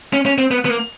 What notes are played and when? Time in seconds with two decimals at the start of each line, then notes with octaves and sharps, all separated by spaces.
0.13 C#4
0.25 C#4
0.38 C4
0.51 B3
0.65 B3
0.70 A#3